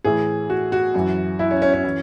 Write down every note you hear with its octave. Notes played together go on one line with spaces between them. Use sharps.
A2 E3 G#4
F#4
F#4
F#2 E3
E4
C#4
C#4
C#4
E3